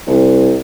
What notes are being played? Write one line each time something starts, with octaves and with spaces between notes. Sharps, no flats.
C2